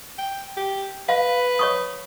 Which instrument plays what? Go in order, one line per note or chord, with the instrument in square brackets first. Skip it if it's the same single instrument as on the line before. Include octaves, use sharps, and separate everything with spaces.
[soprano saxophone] G5
G4
[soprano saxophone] B4 [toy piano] F5
[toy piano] C#5 C#6 D#6